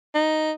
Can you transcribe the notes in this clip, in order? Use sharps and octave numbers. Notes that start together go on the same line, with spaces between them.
D#4